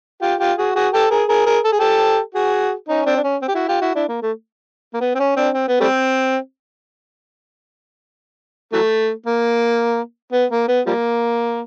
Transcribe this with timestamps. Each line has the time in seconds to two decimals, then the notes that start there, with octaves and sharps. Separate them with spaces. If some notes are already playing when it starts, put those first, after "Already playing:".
0.22 F4 G4
0.40 F4 G4
0.58 F#4 G#4
0.75 F#4 G#4
0.93 G4 A4
1.11 G#4 A#4
1.29 G#4 A#4
1.46 G#4 A#4
1.65 A4
1.73 G#4
1.80 G4 A4
2.35 F#4 G#4
2.89 C#4 D#4
3.06 C4 D4
3.16 D4
3.24 C#4
3.42 C4
3.48 G4
3.54 E4 F#4
3.68 F4 G4
3.81 E4 F#4
3.95 D4 E4
4.08 A#3
4.22 A3
4.94 A#3
5.01 B3
5.15 C4
5.20 C#4
5.37 C4 D4
5.54 C4
5.68 B3
5.80 G3 A3 C4
8.73 E3 F#3 A3
9.26 A#3
10.33 B3
10.52 A#3
10.68 B3
10.86 F3 G3 A#3